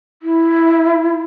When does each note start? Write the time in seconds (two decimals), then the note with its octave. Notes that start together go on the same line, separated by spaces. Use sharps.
0.23 E4